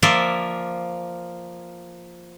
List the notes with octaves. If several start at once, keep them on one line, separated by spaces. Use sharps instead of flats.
F3 A#3 D5 E5 C6